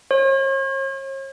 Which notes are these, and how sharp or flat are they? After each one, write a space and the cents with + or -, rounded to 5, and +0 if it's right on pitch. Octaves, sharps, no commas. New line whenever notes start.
C#5 -45